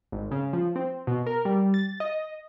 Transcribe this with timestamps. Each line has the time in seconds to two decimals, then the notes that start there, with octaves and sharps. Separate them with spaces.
0.12 G#1
0.31 C#3
0.53 F3
0.76 C4
1.07 B2
1.27 A#4
1.45 G3
1.74 A6
2.00 D#5